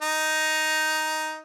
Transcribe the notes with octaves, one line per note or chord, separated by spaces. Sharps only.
D#4